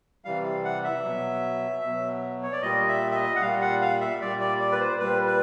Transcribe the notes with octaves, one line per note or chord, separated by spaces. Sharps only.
C3 E3 G3 F5
F#5
E5
B2 F#3
B2 F#3
C#5
D5
A#2 G3 D#5
E5
E5
D#5
F#5
A#2 G3 F5
F#5
F5
E5
A#2 G3 D5
D5
D5
B4
C5
A#2 G3 B4
B4